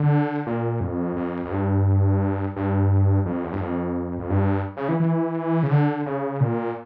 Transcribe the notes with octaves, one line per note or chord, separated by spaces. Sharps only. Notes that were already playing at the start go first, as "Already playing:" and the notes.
Already playing: D3
A#2
F2
F2
F2
G2
G2
F2
E2
G2
F2
F2
G2
C#3
E3
E3
C#3
D3
C#3
A#2